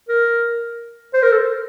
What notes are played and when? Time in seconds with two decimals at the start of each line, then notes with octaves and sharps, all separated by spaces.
0.09 A#4
1.14 C5
1.23 A#4
1.32 A4